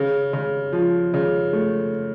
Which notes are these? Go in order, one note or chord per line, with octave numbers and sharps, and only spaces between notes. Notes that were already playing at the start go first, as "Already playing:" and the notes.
Already playing: C#3
C#3
F3
C#3
A3